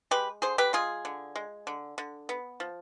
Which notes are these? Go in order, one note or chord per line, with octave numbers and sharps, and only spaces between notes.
G#3 G4 B4
D3 G#4 C5
G4 B4
G#3 F4 G#4
D3
G#3
D3
D3
B3
F3